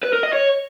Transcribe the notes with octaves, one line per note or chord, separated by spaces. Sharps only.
B4
A#4
D#5
C#5